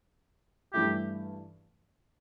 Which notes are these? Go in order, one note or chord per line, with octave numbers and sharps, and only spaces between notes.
G2 E3 A3 E4 G4